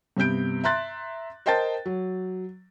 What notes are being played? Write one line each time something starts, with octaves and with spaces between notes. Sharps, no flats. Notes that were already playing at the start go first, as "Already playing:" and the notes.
G2 C3 B3 G6 D7
E5 A#5 C6 F#6 A6
A#4 C5 D#5 G5 A5 A6
F#3